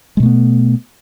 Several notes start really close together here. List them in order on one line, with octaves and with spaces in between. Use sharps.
G#3 B2 A3 B3